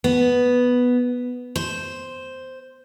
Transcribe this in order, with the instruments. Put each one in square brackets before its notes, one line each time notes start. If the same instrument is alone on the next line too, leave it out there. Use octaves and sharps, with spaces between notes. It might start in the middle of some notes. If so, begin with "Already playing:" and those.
[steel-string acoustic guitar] B3
C5